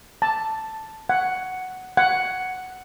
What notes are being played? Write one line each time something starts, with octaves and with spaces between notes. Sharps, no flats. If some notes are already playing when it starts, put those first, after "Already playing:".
A5
F#5
F#5